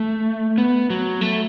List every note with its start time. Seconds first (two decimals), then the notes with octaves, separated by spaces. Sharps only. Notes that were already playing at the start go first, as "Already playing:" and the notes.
Already playing: A3
0.58 B3
0.90 F#3
1.21 A3